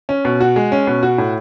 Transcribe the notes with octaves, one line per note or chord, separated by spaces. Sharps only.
C#4
B2
F#4
G#3
C#4
B2
F#4
A2